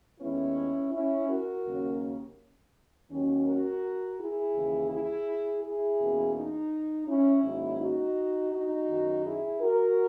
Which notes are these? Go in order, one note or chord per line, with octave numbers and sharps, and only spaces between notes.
D#2 D#3 G#3 B3 C#4 E4
C#4 E4
F#4 A#4
D#2 C#3 F#3 A#3 C#4
D#2 D#3 F#3 C#4
F#4 A#4
E4 G#4
D#2 C#3 E3
E4 G#4
E4 G#4
E2 B2 A#3 C#4
D#4
C#4 E4
G#2 D#3 F#3 A#3 C#4
D#4 F#4
D#4 F#4
F#2 D#3 F#3
E4 G#4
F#4 A#4